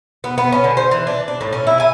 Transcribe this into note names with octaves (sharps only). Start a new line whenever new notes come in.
B3
B3
C#4
D3
C5
E3
D4
D4
A2
C#4
E4
G#5